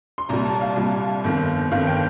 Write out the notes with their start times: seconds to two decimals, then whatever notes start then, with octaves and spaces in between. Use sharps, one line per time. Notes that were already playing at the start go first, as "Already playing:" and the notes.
0.18 C6
0.29 C2 A#2 G3 A#5
0.45 A5
0.61 F5
0.76 C2 A#2 G3
1.24 G1 F2 D#3
1.71 G1 F2 D#3 F5
1.87 G5